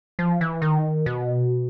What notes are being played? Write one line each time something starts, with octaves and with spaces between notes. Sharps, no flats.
F3
E3
D#3
B2